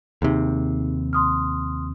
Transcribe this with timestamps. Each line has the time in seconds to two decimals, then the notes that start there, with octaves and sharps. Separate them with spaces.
0.22 D#2 C3 D#4 G#4
1.13 C6 D#6 F6